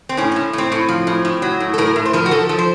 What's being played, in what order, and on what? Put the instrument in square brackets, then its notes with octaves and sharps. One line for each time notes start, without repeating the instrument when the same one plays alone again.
[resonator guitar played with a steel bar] C4
A2 C#4
C#4
A2
A2 C4
A2
F3
A2
A2
F#3
A2
A4
A2 A#4
A2
C5
F3 A#4
F#4
F3 A4
F3
C5